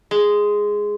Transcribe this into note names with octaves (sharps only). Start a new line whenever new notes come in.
G#3